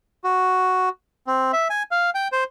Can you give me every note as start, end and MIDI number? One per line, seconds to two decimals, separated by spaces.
0.24 0.89 66
1.27 1.52 60
1.53 1.68 76
1.70 1.83 80
1.91 2.10 77
2.15 2.28 79
2.32 2.44 72